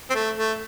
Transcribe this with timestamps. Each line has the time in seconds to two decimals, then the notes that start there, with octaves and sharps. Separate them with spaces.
0.10 C4
0.15 A3
0.37 A3